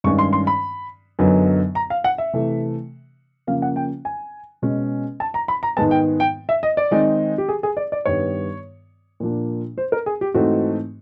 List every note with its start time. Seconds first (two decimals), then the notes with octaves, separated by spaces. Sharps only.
0.04 G2 D#3 G#3 C#4 C#6
0.19 C6
0.33 C6
0.47 B5
1.19 F#2 D3 F#3 B3 D#4
1.75 A#5
1.90 F5
2.04 F#5
2.18 E5
2.33 C3 E3 A3
3.47 C#3 F3 A#3 C#4 F5
3.62 F#5
3.76 G5
4.05 G#5
4.62 B2 G#3 C#4
5.20 A5
5.34 A#5
5.48 B5
5.63 A#5
5.77 G#2 D#3 G#3 B3 A5
5.91 G5
6.20 G5
6.49 E5
6.63 D#5
6.77 D5
6.91 D#3 G#3 C4 D#4
7.38 G4
7.49 G#4
7.63 G#4
7.77 D5
7.92 D5
8.06 G2 D#3 G3 B3 C#5
9.20 A#2 F3 A#3 D4
9.78 C5
9.92 A#4
10.06 G#4
10.21 G4
10.34 G#2 E3 A3 C4 D#4 F#4